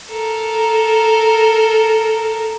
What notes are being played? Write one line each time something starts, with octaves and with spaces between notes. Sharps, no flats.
A4 A#4